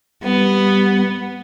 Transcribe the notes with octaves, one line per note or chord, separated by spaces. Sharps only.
G3 B3